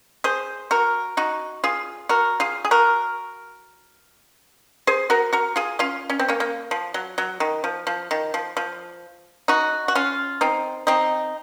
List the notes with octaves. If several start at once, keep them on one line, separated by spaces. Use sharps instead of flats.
G#4 C5
F#4 A#4
D#4 F#4
F4 G#4
F#4 A#4
F4 G#4
G#4
F#4 A#4
G#4 C5
F#4 A#4
F#4 A#4
F4 G#4
C#4 F4
C#4
C4
A#3 C#4
A#3
F3
F#3
F#3
D#3
F3
F3
D#3
F3
F3
D#4 F#4
F#4
C#4 F4
C4 D#4
C4 D#4